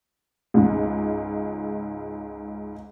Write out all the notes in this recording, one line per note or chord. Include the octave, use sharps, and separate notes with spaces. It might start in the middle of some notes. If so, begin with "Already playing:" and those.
C#2 G#2